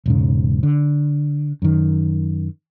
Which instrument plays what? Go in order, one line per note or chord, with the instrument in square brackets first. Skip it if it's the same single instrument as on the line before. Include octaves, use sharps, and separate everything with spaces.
[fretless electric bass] E1 G#2 C#3
D3
F#2 D#3